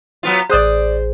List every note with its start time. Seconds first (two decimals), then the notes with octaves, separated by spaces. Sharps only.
0.23 F#3 B3 F4
0.50 A1 G#4 C5 D5 D#6 F#6